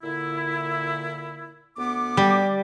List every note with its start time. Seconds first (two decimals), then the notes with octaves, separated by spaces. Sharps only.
0.02 A#2 D3 E4
1.77 D2 B3 D6
2.17 G3